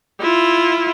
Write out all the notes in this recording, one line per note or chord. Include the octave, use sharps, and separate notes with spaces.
E4 F4